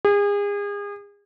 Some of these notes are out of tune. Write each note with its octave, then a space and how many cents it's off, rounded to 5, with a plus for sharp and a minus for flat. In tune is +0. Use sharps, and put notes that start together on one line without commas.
G#4 -35